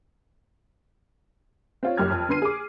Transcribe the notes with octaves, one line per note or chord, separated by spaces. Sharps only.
C4 F4 C#5
F#1 F#2 G4 F6 G#6
F2
D3 B3 C6 C7 D#7
G#4 D6